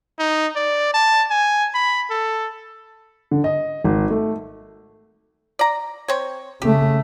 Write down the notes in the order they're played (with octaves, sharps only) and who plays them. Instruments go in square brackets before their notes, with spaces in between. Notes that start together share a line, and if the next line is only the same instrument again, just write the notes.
[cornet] D#4
D5
A5
G#5
B5
A4
[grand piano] D3
D#5
G#1
A3
[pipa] D5 A#5
C4 C#5
[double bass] C#3 A3 [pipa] G4